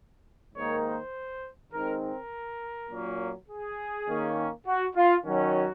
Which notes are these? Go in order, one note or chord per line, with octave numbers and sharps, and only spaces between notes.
G#2 D#3 A#3 D#4 C#5
C5
D#3 G#3 C4 D#4 A#4
A#4
A#2 F#3 A#3 C#4
G#4
D#3 A#3 C#4
F#4
F4
D#3 F#3 C#4 F#4